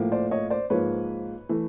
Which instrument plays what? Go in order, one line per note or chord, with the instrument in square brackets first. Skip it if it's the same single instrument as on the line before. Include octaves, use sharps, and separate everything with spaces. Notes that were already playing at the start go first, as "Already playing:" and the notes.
Already playing: [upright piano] A2 F3 A#3
C5 D5
C#5 D#5
C5 D5
G#2 F3 A#3 B4 C#5
E3 A3